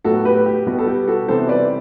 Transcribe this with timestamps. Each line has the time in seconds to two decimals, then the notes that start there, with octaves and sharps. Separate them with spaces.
0.05 A2 F#3 B3 F#4 A4
0.25 G4 B4
0.46 G4
0.66 B2 G3 B3 F#4
0.79 A4
0.87 G4
1.08 F#4 A4
1.28 C3 E3 G3 B3 A4 C5
1.49 B4 D5